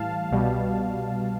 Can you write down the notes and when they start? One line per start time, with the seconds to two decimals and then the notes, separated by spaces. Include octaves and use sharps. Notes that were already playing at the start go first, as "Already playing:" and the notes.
Already playing: A2 E3 G3 F5 A5
0.31 C2 B2 G3